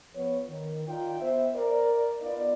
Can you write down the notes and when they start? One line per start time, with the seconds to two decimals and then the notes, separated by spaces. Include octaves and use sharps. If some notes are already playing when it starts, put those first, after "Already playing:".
0.15 F3 B3 C#5
0.49 D#3
0.88 D#4 F4 D5 G5
1.21 B3 C5 E5
1.56 A#4 D5
2.21 B3 D#4 F4 D5